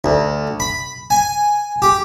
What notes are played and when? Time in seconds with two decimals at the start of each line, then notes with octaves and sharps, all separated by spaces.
0.04 D2
0.60 B5
1.10 G#5
1.82 G4